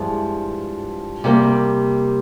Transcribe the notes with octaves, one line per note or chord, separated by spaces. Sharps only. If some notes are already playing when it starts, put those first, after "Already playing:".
Already playing: G2 F3 G#3 E4
C3 G3 A#3